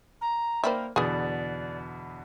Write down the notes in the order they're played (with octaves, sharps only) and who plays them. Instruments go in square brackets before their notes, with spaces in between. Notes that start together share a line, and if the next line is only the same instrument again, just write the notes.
[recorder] A#5
[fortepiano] A#3 G5 B5 [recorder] A#4 [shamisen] C5 D5 E5
[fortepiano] E2 B2 D3 [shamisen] B3 G#4 [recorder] D5